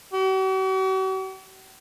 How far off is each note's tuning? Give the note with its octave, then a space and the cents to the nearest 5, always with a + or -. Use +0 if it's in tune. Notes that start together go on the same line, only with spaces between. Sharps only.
F#4 +45